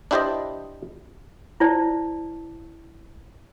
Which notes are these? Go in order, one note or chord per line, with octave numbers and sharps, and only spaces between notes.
D4 E4 G4 C5 D5 D#5
E4 C5 D5 A5